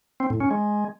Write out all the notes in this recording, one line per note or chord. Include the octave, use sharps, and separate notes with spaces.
C4
A2
C#4
G#3